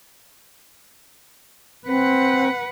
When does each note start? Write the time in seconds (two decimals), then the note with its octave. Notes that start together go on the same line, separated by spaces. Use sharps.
1.87 C4 B4 F#5